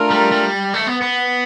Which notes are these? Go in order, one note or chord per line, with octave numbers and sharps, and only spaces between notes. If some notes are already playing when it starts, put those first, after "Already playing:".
Already playing: A3 D4 F4 A#4
G3
G3
A3
B3
B3